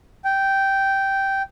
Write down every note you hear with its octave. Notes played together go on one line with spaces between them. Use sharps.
G5